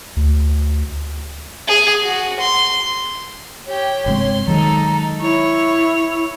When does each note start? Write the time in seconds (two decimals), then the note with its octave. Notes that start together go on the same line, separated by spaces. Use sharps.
0.16 D2
1.67 G#4
2.04 F#4
2.40 C6
3.67 G4 C#5 G5
4.06 G1 C3 G#3 C6
4.48 D#3 F#3 G#3 D#4 A4 A#5
5.21 E4 C#5